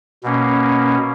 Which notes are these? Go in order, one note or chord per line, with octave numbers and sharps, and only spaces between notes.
B2 A#3 C#4